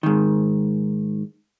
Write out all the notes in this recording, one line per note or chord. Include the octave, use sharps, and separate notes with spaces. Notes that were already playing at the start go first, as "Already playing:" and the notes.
G#2 D#3